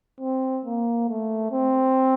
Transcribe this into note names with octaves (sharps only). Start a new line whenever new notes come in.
C4
A#3
A3
C4